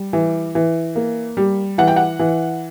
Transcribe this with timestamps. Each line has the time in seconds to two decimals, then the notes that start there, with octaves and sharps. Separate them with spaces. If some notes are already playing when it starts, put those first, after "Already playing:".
Already playing: G3
0.13 E3
0.55 E3
0.96 A#3
1.37 G3
1.78 E3 F#5
1.88 G5
1.96 F#5
2.19 E3